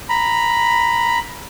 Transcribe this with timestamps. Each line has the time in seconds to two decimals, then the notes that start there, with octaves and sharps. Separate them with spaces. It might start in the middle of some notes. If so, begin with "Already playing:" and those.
0.09 A#5 B5